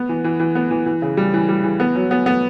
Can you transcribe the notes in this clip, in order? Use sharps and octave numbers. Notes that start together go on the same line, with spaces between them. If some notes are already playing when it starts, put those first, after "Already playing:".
Already playing: B3
E3
E3
E3
B3
E3
E3
C#3
G3
E3
G3
E3
B3
F#3
B3
B3